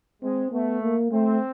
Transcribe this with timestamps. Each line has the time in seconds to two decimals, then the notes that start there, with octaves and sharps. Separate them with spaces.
0.22 G#3 C4
0.52 A3 B3
0.82 A#3
1.11 A3 C4